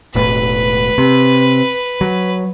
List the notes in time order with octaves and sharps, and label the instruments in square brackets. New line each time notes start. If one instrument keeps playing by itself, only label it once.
[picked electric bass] E1 A2 [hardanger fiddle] B4
[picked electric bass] C3
F#3